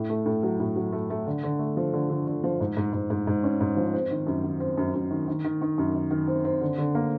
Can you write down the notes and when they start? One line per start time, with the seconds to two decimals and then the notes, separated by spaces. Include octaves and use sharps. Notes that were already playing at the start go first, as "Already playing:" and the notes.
Already playing: A2
0.09 A3
0.26 A2
0.43 F#3
0.60 A2
0.76 F#3
0.93 A3
1.10 A3
1.27 D3
1.43 D3
1.59 A3
1.77 F3
1.94 D3
2.10 D3
2.27 D3
2.44 F3
2.60 G#2
2.77 G#2
2.93 G#2
3.10 G#2
3.27 G#2
3.44 C#4
3.61 G#2
3.77 F3
3.94 C4
4.11 D#3
4.27 F#2
4.44 D#3
4.60 C4
4.77 F#2
4.94 F#2
5.11 D#3
5.28 D#3
5.44 D#3
5.61 D#3
5.78 F#2
5.95 D#3
6.11 D#3
6.27 C4
6.45 C4
6.61 D3
6.78 D3
6.95 A#3